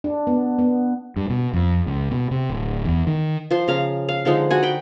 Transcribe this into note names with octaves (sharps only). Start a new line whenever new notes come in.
D4
B3
B3
G2
B2
F2
C#2
B2
C3
D1
E2
D#3
F3 C5 C6
C#3 F5 A#5
F5
D3 F3 G#3 D#4
F#4 F#5 G#5
G5 B5